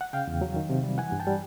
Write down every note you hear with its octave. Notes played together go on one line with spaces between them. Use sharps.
F#5
C#3 F5 G5
E2
F#3
D#3
C3
G3
E3 F#5 G#5
G2
G5 A5
G3